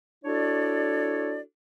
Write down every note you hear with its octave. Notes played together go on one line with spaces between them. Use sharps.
D4 E4 F#4 A4 C#5 D5